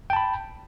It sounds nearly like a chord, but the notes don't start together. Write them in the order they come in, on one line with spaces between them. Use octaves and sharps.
G5 A5 B5